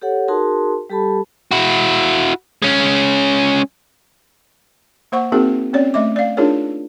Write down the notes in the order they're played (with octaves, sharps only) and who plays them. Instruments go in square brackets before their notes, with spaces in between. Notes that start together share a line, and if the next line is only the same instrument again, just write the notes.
[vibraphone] G4 A4 C#5 F#5
D#4 F#4 G#4 A#4 A5 C6
G3 G4 A4 A5 B5
[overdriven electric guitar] E4 F#4
G#3 C#4
[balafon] A#3 C5 F#5 C#6
A#3 C4 D#4 F#4 G#4 A#4
C4 C#4 C#5 D5
A3 D#5 E5 D6
D5 F5
D4 D#4 F4 G#4 A#4 C#5